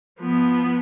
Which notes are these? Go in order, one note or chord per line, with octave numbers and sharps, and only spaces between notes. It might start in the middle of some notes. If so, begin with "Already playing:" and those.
F3 B3